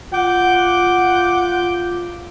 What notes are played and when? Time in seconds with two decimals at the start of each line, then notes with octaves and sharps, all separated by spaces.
0.13 F4 F#5 D6 G6